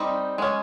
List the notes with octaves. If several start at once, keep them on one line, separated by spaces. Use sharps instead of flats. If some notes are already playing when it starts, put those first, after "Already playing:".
Already playing: G3 C4 D#4
G#3 C#4